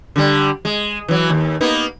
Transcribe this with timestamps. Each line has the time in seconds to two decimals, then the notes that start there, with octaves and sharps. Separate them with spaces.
0.16 D3 G3
0.65 G#3
1.08 E3 F#3
1.30 D#2
1.61 A#3 B3 D#4